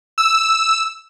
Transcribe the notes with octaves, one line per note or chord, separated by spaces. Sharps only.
E6